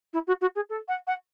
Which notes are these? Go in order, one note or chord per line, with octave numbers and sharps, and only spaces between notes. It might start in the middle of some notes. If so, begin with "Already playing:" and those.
E4
F#4
F#4
G#4
A4
F#5
F#5